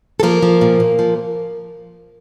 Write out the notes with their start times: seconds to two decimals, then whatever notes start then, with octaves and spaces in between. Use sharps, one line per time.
0.20 A4
0.23 F3 A#3 A#4
0.43 F3
0.61 A#2
0.80 A#2
0.99 F3